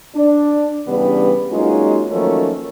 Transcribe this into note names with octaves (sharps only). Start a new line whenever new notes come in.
D4
G2 C#3 E3 G3 B3 D4
F#3 G#3 A#3 C#4 D#4 F4
D#3 F3 F#3 A3 A#3 C#4